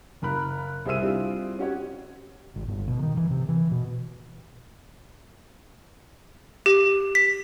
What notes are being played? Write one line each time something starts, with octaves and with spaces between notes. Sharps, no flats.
F#1 A#4 B5 F#6
C2 G#4 C5 E5 E6 D#7
G3 C4 D4 E4 F4 G#4
C#4 F#4 G4 C#5
G#1
G1
B2
D#3
E3
C3
E3
B2
G4
B6